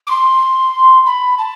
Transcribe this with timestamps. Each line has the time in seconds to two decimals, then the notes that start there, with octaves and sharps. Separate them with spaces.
0.07 D6
0.10 C6
1.06 B5
1.38 A5